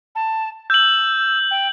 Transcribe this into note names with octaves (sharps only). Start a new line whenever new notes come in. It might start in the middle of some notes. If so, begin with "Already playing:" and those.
A5
E6 G6 F#7
G5